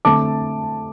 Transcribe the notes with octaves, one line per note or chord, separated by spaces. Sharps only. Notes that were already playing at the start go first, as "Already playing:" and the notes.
D3 A3 C4 A5 D6